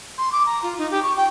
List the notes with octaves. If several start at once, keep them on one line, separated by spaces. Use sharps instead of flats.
C6
D6
A#5
F4
D#4
G4
C#6
G5